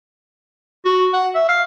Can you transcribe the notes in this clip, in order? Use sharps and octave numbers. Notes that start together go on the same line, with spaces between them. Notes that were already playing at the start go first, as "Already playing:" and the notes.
F#4
F#5
E5
F5